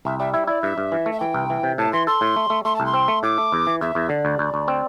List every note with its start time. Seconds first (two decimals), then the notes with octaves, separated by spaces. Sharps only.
0.05 C2 E5
0.19 G3 E5
0.34 E4 E5
0.47 E4 D5
0.62 G2 E5
0.78 G2
0.92 E3
1.06 A3
1.12 E5
1.20 E3 G5
1.34 C2
1.50 E3
1.63 C3
1.78 A2 A5
1.93 E3 C6
2.07 A4 C6
2.21 A2
2.36 A3
2.50 A3
2.65 A3 C6
2.76 C2 A5
2.86 C6
2.94 C4
3.08 A3
3.23 A2 D6
3.38 A3
3.52 E2
3.67 E3
3.81 E2 E5
3.95 E2
4.09 D3 D5
4.25 D2
4.39 D2
4.54 D2
4.68 C4